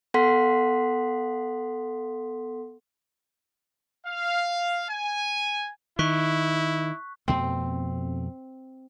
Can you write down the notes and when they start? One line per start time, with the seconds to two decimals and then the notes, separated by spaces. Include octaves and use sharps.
0.14 B3 A4 F#5 C6 B6
4.06 F5
4.90 G#5
5.99 D#3 E4 C#6 F#6 B6
7.28 F2 B2 A3 C4